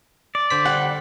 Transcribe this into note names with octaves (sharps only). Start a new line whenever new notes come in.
D5
D3 C5 B6
G3 F#5